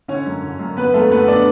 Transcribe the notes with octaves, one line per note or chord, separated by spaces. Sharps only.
D3 C#4 C#5
F#2
D3
F#2
D3 B3 B4
F#2 A3 A4
D3 B3 B4
D4 D5